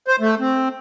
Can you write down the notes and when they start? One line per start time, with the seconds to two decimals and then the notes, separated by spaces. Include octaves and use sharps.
0.08 C5
0.20 A3
0.40 C4